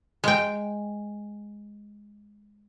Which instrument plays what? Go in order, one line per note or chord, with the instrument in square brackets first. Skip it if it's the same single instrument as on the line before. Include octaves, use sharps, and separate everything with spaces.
[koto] G#3 G5